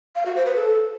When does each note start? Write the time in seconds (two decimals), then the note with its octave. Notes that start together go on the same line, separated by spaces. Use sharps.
0.16 F5
0.26 F#4
0.36 C5
0.46 B4
0.56 A4